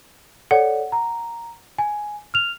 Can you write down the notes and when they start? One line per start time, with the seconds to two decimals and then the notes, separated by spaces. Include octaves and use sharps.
0.51 A4 C#5 D5 F#5
0.92 A#5
1.78 G#5
2.34 F6 F7